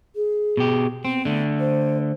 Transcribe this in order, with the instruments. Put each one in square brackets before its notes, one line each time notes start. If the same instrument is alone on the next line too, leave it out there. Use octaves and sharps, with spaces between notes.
[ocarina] G#4
[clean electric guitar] B2 G4
[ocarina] B3 [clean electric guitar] C4
[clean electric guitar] D3 A3
[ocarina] C5